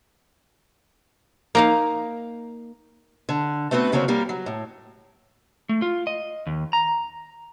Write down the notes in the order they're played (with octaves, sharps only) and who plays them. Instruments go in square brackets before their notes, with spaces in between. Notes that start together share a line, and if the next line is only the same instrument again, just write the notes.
[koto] A#3 D#4 F5
[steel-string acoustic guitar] D3
A3 B3 C4 F#4 B4
D2 C#3 F#3 A#3 C4 C#4
G3 A#3 G4 A#4
F#3
A2
[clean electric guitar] A3
F4
D#5
D#2
A#5